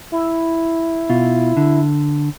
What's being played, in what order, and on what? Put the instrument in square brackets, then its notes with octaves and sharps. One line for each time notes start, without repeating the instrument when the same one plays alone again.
[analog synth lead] E4
[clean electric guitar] B2 F4
D3